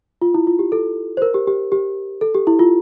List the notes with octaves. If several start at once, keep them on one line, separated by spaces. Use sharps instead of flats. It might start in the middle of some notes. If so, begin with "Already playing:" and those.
F4
E4
F4
G4
A4
C5
A#4
G4
G4
G4
A4
G4
E4
F4